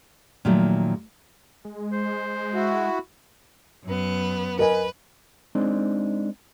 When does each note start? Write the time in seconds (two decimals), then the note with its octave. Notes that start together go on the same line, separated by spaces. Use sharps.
0.45 A#2 D#3 F3 F#3 A3
1.65 G#3
1.92 C5
2.54 E4 F#4
3.85 F#2 B3
4.59 A#4 B4 D#5 G#5
5.55 G#3 C4 D4 D#4